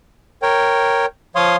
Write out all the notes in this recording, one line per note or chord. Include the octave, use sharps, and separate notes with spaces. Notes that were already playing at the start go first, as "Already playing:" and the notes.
A#4 C#5 G5
F3 C#5 F5 C6 D#6